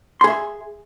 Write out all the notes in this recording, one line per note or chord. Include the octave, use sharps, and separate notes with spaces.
G#4 E5 C6